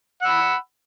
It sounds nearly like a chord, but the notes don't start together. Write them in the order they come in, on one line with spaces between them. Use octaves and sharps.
F#5 E6 B5